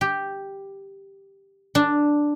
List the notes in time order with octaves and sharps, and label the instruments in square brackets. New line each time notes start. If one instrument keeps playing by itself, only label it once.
[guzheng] G4
D4